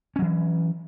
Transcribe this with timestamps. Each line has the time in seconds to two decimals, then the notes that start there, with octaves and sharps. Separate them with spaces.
0.16 C#4
0.19 F#3
0.22 E3